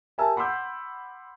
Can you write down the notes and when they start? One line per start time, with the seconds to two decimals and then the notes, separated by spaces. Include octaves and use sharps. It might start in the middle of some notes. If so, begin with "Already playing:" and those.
0.18 G4 A#4 E5 G#5 A5 E6
0.36 F#5 B5 C6 D6 E6 G6